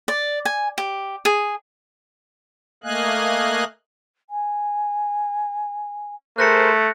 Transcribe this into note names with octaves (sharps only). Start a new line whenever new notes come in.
D5
G#5
G4
G#4
A3 A#3 D#5 F5 G#5 F#6
G#5
A3 G#4 A#4 C5 F#6 A#6 C#7